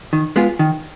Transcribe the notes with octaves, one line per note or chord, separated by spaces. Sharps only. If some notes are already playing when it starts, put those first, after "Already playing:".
D#3
G#3 B3 F4 G#4
D#3